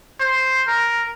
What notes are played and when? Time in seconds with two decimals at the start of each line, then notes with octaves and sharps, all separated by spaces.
0.20 C5
0.67 A#4